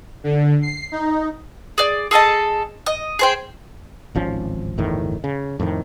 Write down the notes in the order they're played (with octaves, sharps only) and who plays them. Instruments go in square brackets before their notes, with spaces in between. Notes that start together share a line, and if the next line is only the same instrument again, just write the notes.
[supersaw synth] D3
C7
D#4
[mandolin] G#4 D5
G#4 A4 D#5 A5
D#5
G#4 C5 G5
[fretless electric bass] D1 G#1 F3 C#4
G1 E2 A2 D#3
C#3
F2 A2 D3 D#3